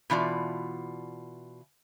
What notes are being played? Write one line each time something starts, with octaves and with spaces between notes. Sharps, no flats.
B2 E3 F4 D5